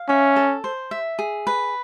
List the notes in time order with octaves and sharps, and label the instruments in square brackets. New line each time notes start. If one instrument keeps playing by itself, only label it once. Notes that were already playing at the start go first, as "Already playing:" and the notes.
Already playing: [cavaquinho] F5
[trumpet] C#4 [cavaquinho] E5
[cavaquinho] A4
C5
E5
G#4
B4